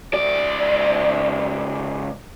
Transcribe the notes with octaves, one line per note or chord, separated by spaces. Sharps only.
C#2 D5